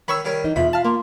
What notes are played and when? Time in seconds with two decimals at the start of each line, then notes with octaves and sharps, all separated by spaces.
0.08 D#3 C#5 B5 C#6 E6
0.25 D#3 G3 C#5
0.44 E3 D#4 E4
0.56 E2 B2 F4 E5 B5
0.73 F5 A5 F6
0.85 A#3 C6